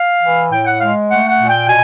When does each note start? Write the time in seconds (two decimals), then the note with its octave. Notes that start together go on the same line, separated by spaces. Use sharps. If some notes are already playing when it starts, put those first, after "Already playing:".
Already playing: F5
0.22 E3
0.51 A2 G5
0.66 F#5
0.80 G#3 F5
1.09 A3 F#5
1.28 F#5
1.39 A#2
1.48 G5
1.67 B2 G#5